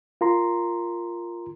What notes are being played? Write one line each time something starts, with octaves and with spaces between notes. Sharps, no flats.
F4 A#4 A#5 C6